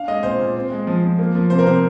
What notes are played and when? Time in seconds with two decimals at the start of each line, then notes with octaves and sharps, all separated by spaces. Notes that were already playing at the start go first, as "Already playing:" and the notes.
Already playing: D4 F5
0.08 G#3 D#5
0.23 A#2 C5
0.39 A#2
0.56 C4
0.71 G#3
0.87 F3
1.03 F3
1.19 A#3
1.35 F3
1.50 C3 C5
1.59 A#4
1.66 C3 C5